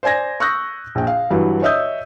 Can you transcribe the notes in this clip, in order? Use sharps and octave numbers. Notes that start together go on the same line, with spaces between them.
C5 D5 G#5 G#6 A#6
C#6 D#6 E6 F#6 G6 A#6
A#1 G5
F5
G2 E3 F#3
C#5 D#5 E5 D#6 E6 G6